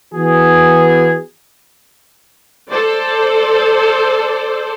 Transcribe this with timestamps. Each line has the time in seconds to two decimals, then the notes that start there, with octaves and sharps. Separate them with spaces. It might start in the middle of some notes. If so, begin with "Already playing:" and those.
0.14 E3 B3 F#4 G#4
2.69 A4 C5 D5